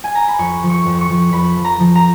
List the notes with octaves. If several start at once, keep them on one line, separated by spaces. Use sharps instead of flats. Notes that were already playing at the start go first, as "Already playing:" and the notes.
G#5
A#5
B5
F2 C#6
F3
C#6
F2
C#6
F3
F2 B5
F3
A#5
F3
A#5